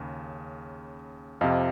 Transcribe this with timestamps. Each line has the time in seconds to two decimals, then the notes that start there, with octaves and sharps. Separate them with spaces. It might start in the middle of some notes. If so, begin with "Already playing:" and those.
Already playing: D#2 C#3
1.41 F2 C3 F3 D#5 F5